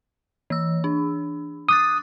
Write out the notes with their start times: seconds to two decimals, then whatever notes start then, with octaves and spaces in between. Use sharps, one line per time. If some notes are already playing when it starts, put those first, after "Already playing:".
0.50 E3 E6
0.84 D4
1.69 D6 D#6 F#6 A6